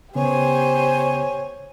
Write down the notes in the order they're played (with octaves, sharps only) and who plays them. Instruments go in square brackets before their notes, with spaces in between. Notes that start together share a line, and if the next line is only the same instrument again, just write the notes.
[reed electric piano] C#3 B3 [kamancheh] G4 C5 [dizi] C#5 [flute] G#5